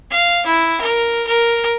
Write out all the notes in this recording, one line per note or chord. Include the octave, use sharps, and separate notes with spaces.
F5
E4
A#4
A#4